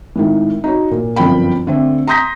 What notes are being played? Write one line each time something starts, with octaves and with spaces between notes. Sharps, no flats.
G#1 A2 D#3
D#4 F#4 C#5
A#2
G1 F#2 F3 C4 G5 B5
D3 A3 C4
A#5 C6 D#6 G6 A#6 B6